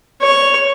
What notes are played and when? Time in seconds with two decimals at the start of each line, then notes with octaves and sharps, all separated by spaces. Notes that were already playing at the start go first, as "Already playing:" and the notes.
0.22 C#5